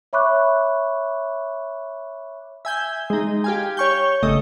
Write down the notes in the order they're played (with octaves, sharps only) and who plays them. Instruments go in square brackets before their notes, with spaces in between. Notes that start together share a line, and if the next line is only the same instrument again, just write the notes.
[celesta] C#5 E5 B5 C#6 D6 F#6
[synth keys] E5 G#5 G6
G#3 D#4
G4 F5 G#5
C#5 C#6 G6
G1 C#3 A3 D#5